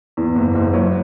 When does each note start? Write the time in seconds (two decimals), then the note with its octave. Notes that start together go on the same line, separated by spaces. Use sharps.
0.17 E2
0.36 F#1
0.55 F#1
0.73 F#3